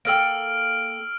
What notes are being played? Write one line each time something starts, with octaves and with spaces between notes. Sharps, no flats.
A#3 A4 G5 E6 F6 D7